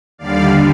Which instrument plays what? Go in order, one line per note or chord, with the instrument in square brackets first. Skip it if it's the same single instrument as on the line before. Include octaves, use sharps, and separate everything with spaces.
[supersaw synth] D#2 D3 G3 D5 F5